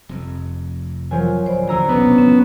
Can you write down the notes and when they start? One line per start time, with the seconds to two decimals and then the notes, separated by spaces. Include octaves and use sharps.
0.09 F1 F2
1.11 F3 F#3 F4 A#4 G#5
1.46 D1 C5 D5 B5
1.67 D#2 D3 F#3 A#5 E6
1.89 B1 E2 C3 A#3 B3 C#4 D4
2.18 C#2 F#2 A2 C#4